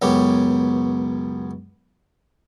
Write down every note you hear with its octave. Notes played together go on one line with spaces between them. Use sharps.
C#2 F#2 B2 B3 G4